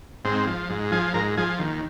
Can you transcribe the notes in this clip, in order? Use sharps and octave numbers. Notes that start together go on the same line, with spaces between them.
G#2 C4
F3
G#2
F3 G#4
G#2 A#4
F3 G#4
D#2